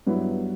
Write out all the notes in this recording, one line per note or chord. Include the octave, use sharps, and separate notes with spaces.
G2 F#3 B3 E4